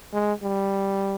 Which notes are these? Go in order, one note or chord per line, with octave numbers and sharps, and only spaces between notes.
G#3
G3